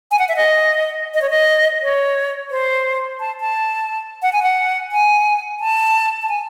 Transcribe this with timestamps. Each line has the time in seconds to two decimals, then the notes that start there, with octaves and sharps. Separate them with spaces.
0.11 G#5
0.19 F#5
0.29 E5
0.36 D#5
1.14 D#5
1.22 C#5
1.30 D#5
1.82 C#5
2.51 C5
3.20 A5
3.40 A5
4.22 F#5
4.33 G#5
4.43 F#5
4.92 G#5
5.60 A5
6.22 A5
6.29 G#5